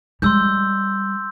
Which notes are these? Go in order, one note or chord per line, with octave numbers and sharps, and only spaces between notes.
G3 G#3 C6 E6 G6